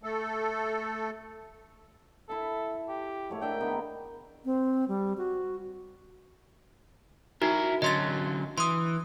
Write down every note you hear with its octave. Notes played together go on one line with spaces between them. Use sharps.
A3 A4
E4 A4 E5
G4
G#2 A3 C#5
D4 A#4 E5 G5
D#3 B3
C4
G3
F#4
D#4 E4 F#4 A#4
D3 F#3 C#4 D#5 C6 A6
E3 C6 D#6